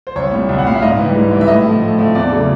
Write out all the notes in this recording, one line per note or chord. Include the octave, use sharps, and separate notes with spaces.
C5
C2 C#5
A#2 G3
C2
F#5
A#2 G3 F5
E5
G#2 D#5
E3 G3
G#2
E3 G3
E5
A2 D#5
F3 A3
A2
F3 A3
E2 D5
C#3 F#3 A3